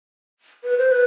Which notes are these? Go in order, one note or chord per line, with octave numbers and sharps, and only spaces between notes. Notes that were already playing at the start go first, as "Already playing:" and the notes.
B4
C5
B4